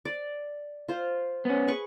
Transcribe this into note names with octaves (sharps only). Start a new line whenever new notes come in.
D5
F4 C5
B3 C#4
G#4 B4 C#6